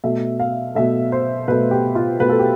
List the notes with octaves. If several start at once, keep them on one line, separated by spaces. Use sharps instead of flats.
B2 A3 E5
F5
B2 A3 E5
C5
B2 A3 B4
G4
F4
B2 A3 B4
A4
G4